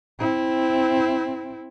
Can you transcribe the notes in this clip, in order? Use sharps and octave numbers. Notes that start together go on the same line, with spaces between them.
C4 E4